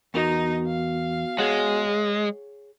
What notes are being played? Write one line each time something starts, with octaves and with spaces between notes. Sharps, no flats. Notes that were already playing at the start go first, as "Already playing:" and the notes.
E2 B3 D#4 F#4 A#4 D#5 A#5
F5
G#3 G#4 C#5 F#5